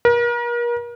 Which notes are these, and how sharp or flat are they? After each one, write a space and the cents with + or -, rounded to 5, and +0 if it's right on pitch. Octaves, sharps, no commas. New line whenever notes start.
A#4 +35